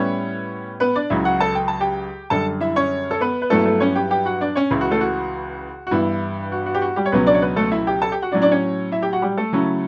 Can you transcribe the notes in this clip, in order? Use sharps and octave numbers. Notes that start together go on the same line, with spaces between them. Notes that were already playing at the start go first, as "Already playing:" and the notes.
Already playing: A2 G3 B3 C#4 E4 C#5
B3 B4
D4 D5
C#2 C#3 F#3 E4 E5
F#4 F#5
A4 A5
G5
A5
G4 G5
F#2 D3 G3 A4 A5
E4 E5
C#4 C#5
A4
B3 B4
B4
G2 F#3 A3 B3 E4 A4
A3 A4
C#4 C#5
G4 G5
G4 G5
F#4 F#5
D4 D5
C#4 C#5
C#2 C#3 E3 E4
F#4
A3 A4
F#4
F#4
G2 E3 B3 E4
F#4
F#4
G4
F#4
G3 G4
C#5
C#2 B2 F#3 B3 C#4 B4
D4 D5
C#5
B3 B4
A3 A4
E4 E5
G4 G5
A4 A5
G4 G5
F#4 F#5
A2 F#3 C#4 D4 D5
D4 D5
C#4 C#5
E4 E5
G4 G5
F#4 F#5
G3 G4
A3 A4
C#3 F#3 C#4 E4